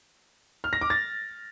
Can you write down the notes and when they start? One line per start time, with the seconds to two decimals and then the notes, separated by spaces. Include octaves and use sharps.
0.64 F6
0.73 A#6
0.81 D6
0.90 A6